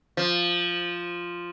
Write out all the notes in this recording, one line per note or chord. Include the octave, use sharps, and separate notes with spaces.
F3